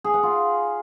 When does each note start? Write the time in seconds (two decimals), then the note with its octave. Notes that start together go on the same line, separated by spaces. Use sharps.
0.04 G#4
0.14 F#5
0.23 F4